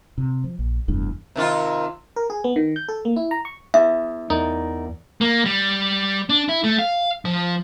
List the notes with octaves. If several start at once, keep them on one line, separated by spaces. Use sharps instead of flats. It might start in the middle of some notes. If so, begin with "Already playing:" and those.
C3
F3
A#1
F1 E2 G2
C3 D#3 F4
A#4
G#4
B3
D#3
G6
A4
A#3
E4
A#5
C#6
E2 E5
E2 D#4 A#4 D5
A#3
G3
D4
E4
A3
F5
F3